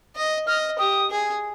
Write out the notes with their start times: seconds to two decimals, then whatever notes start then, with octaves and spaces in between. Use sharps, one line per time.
0.16 D#5
0.47 D#5 F6
0.78 G4 D#6
1.11 G#4